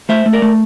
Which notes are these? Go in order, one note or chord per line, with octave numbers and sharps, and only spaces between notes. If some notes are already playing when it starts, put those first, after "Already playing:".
A3 C5 E5
A3
A#4 D5
A3